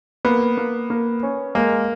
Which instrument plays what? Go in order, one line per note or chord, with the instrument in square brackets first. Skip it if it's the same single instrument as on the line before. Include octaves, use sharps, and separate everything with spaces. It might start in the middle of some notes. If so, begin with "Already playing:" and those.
[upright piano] A#3 [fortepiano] B3
[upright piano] A#3
A#3
C#4
[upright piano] G#3 [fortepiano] A#3